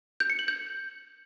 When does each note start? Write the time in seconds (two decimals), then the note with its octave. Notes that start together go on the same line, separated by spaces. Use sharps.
0.20 G6
0.30 C#7
0.39 F#7
0.48 G6